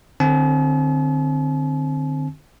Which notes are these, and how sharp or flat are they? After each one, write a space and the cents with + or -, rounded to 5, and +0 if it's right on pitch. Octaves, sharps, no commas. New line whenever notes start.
D3 +35 C4 +10 A5 -45